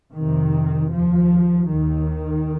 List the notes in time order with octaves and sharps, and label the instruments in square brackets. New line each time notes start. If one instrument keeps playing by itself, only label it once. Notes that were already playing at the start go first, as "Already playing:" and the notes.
[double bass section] F2 C3 D#3
D#2 F3
D#2 D#3